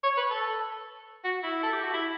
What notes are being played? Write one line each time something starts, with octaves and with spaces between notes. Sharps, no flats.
C#5
B4
A4
F#4
E4
A4
G4
F#4
E4